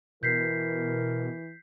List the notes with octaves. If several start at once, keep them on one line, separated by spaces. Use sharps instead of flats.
B2 E3 A#4 G6 B6 C7